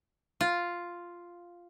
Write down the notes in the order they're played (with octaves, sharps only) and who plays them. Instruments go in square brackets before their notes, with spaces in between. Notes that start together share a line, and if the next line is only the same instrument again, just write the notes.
[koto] F4